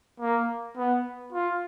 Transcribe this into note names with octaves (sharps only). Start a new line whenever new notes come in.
A#3
B3
F4